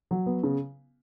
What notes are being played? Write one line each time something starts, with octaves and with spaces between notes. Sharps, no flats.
F#3
B3
C#3